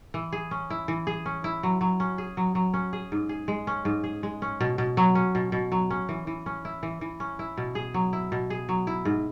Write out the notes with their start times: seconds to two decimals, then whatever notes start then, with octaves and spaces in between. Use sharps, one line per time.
0.14 E3
0.33 G#4
0.51 C#4
0.70 E4
0.88 E3
1.07 G#4
1.26 C#4
1.44 E4
1.63 F#3
1.81 F#3
2.00 C#4
2.18 G#4
2.37 F#3
2.55 F#3
2.74 C#4
2.93 G#4
3.12 G#2
3.29 G#4
3.48 G#3
3.67 C#4
3.85 G#2
4.04 G#4
4.23 G#3
4.42 C#4
4.61 B2
4.78 B2
4.97 F#3
5.15 C#4
5.35 B2
5.52 B2
5.72 F#3
5.90 C#4
6.09 E3
6.27 E3
6.46 C#4
6.65 E4
6.83 E3
7.01 E3
7.20 C#4
7.39 E4
7.58 B2
7.75 G#4
7.94 F#3
8.13 E4
8.32 B2
8.50 G#4
8.69 F#3
8.87 E4
9.05 G#2